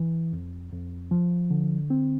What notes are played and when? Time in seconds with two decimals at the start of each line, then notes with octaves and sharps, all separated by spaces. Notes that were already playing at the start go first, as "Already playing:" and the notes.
Already playing: E3
0.33 F2
0.72 F2
1.11 F3
1.50 D3
1.90 C4